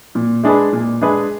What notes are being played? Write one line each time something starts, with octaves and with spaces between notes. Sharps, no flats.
A#2
G#3 D4 G#4 B4
A#2
G#3 D4 G#4 B4